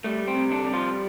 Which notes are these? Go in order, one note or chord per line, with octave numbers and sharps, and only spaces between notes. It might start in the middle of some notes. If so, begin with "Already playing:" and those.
G3 A3
C4
C3
D3 D4
G3
F3 F4